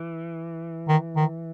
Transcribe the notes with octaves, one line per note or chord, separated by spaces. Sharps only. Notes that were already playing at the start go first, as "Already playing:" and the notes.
Already playing: E3
D#3
D#3